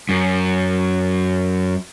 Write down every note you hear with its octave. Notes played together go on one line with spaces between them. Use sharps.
F#2